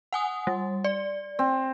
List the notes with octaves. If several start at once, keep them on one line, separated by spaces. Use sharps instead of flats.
F#5 G#5 D#6
G3
D5
C4